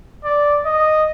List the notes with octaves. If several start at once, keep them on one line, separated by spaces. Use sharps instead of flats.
D5
D#5